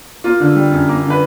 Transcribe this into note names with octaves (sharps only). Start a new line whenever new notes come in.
A#3 F4
D3
G3
F#2
A#3
D3
B4